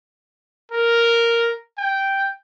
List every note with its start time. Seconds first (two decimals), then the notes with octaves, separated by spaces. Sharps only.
0.72 A#4
1.78 G5